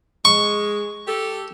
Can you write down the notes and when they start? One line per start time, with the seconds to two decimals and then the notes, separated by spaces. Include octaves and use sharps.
0.25 G#3 C#6
1.08 G4 A4